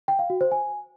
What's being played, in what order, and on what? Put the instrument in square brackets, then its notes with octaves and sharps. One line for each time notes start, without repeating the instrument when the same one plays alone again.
[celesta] G5
F5
F#4
C5
G#5